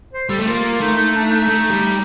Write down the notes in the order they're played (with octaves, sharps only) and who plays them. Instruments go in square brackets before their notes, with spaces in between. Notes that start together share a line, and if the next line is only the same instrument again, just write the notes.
[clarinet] C5
[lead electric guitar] G3 [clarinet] A4
[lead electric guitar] A3
[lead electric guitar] A#3 [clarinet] F4
[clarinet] F4
[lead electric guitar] A3 [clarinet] D#4
[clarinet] D#4
D4
D#4
[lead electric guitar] A3
G3